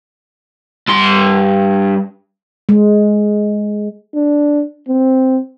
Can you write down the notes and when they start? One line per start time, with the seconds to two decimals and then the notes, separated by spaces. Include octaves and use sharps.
0.88 G2 C6
2.69 G#3
4.15 D4
4.89 C4